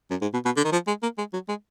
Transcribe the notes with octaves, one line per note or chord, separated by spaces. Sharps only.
F#2
G#2
B2
B2
D3
D#3
F3
G#3
A#3
G#3
F#3
G#3